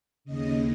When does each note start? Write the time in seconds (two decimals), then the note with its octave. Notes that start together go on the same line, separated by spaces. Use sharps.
0.25 D#2 C#3 D#5